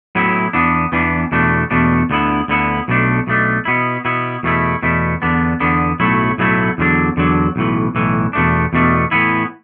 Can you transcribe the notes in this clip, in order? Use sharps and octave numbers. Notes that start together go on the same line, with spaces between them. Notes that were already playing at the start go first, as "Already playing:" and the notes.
A2 F#3 B3 E4
E2 E3 B3 D4
E2 E3 B3 D4
E2 B2 A3 D4
E2 B2 A3 D4
D2 D3 B3 E4
D2 D3 B3 E4
B1 B2 A3 D4
B1 B2 A3 D4
B2 B3 E4
B2 B3 E4
E2 B2 A3 E4
E2 B2 A3 E4
E2 D3 B3 D4
E2 D3 B3 D4
B1 A2 F#3 A3 E4
B1 A2 F#3 A3 E4
E2 D3 F#3 D4
E2 D3 F#3 D4
B1 A2 E3
B1 A2 E3
E2 B2 A3 D4
E2 B2 A3 D4
A2 E3 B3 E4